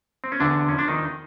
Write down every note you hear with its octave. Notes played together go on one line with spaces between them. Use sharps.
C4
C#4
E2 D3 D4
C3
F3 C#4
D4
E2 D#3 D#4